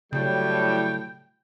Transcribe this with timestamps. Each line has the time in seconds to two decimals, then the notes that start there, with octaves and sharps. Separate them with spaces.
0.13 A2 C#3 F#3 G3 G5